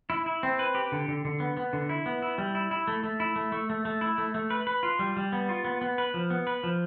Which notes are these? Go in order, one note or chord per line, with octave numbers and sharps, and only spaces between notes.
E4
E4
C4
B4
G4
D3
D3
D3
B3
B3
D3
E4
B3
E4
G3
E4
E4
A3
A3
E4
A3
A3
A3
A3
E4
A3
A3
B4
B4
F4
G3
G3
B3
F4
B3
B3
B4
F3
B3
B4
F3